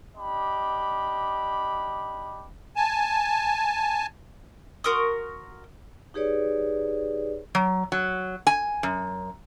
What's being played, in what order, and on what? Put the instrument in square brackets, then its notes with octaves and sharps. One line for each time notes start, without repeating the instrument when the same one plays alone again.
[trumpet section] D4 G4 D#5 B5
[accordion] G#5 A5
[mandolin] F#4 A#4 C6 D#6
[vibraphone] D#4 G4 G#4 B4 C#5 D5
[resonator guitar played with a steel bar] F#3
F#3
G#5
F#2